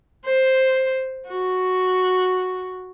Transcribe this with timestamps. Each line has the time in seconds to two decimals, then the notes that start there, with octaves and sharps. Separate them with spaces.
0.26 C5
1.28 F#4